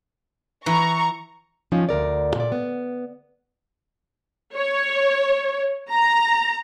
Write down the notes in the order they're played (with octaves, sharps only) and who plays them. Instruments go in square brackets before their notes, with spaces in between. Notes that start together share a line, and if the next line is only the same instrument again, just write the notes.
[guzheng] E3 [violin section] A#5 C#6
[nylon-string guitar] F3 C#4 D#4
D2 A#4 D5
A#2 D5
B3
[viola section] C#5
A#5